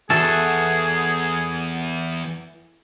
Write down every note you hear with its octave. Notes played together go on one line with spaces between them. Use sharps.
E2 E3 F#4 G#4 A4